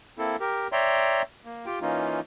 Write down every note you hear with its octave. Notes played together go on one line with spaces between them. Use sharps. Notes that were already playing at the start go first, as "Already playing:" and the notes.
A#3 C4 E4 A4
G4 A#4
C#5 D5 E5 G5 A#5 C6
A#3
F4 G4 G5
E3 A#3 C#4 D#4 F4